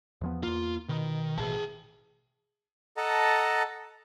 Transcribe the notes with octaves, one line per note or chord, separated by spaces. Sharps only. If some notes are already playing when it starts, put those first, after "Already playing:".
E2 F3 B3
E2 A#3 F4
B2 D#3
A1 B2 E3 G#4 A5
A4 D#5 F#5 A5 A#5